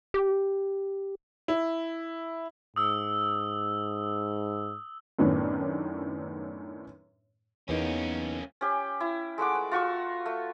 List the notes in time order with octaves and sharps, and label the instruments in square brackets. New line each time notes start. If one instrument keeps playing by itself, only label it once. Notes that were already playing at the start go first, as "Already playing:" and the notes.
[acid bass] G4
[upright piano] E4
[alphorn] G#2 [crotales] D#6 E6
[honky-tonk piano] F#2 A2 D#3 B3 C#4 D4
[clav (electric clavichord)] E2 [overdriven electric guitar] A#3 C#4 [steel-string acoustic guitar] B3 D#4 A#4
[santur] C#4 G4
E4
G#3 A3 F#5 D6
B4
F4 F#4 C#6 E6
A3